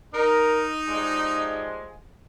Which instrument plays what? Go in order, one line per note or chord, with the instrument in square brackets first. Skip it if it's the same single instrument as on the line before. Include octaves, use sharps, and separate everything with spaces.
[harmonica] D#4 [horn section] A#4
[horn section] F3 G3 G#3